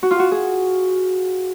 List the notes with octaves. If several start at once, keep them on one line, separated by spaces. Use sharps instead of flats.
F#4
F4
F#4
G#4